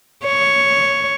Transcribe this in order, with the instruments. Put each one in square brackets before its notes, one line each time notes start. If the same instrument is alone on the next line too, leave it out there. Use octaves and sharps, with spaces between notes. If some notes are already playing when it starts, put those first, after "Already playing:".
[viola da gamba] C#5